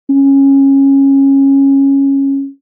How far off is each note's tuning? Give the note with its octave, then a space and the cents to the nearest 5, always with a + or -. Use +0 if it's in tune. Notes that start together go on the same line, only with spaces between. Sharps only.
C#4 -15